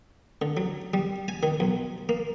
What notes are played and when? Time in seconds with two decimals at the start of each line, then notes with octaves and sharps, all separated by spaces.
0.42 D3
0.57 F#3
0.94 G3
1.28 G#5
1.43 D#3
1.60 B1
2.09 A#3